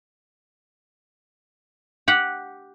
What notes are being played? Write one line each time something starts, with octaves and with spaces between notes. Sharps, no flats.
G4 F#5